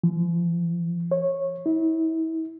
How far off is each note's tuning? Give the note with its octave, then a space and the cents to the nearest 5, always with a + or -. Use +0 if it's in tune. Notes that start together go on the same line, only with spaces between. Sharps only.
F3 -40
C#5 -15
E4 -35